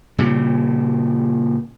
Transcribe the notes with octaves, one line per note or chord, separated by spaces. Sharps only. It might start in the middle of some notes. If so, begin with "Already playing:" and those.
A#2 C#3 G3